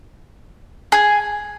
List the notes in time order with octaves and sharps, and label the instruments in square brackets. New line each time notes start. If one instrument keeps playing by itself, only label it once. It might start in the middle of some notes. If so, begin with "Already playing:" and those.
[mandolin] G#4